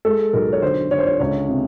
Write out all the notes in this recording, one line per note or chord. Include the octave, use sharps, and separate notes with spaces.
G#3 A4
B1 A#4
C#5
D3 C5
D3 C#5
C5
C#5
C#2 C#5
C3